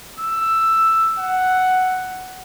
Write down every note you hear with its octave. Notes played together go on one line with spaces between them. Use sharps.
E6
F#5